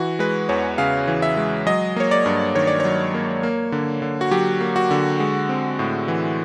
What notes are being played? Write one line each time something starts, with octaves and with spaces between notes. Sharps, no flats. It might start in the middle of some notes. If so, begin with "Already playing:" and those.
Already playing: E3 F#4
G#3 B4
E2 C#5
C#3 F5
E3
E5
G#3
F#3 D#5
A#3 C#5
D5
G2
D#3 C#5
D5
F#3 C#5
A#3
A#3
D3
D3
F#4
F#3 G4
A#3
F#4
D3
G#3
C4
A2
E3